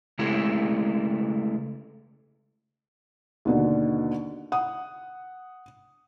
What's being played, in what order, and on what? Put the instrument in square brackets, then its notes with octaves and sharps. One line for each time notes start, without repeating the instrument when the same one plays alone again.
[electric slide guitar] C#3 G#3 A3 E4
[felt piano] D#2 B2 D3
F#5 D#6